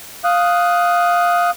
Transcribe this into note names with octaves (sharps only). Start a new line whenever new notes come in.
F5 D#6 F#6